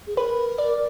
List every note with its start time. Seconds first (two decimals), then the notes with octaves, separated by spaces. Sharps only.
0.07 G#4
0.17 A#4 B4
0.58 D5